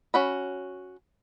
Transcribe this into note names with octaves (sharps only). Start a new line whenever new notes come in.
C#4 F#4 B5